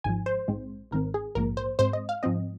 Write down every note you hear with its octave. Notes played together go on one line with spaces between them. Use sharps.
G#1 G#2 F3 G#5
C5
A#1 G#2 G#3 C4
G#1 G#2 D#3 C4 A#4
G#4
A#1 G#2 F3 A#3 A#4
C5
G#2 G#3 C4 C5
D#5
F5
G#2 F3 C4 D#5